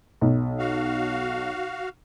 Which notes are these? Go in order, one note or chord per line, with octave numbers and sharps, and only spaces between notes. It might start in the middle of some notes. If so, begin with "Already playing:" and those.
B1
F#4 F5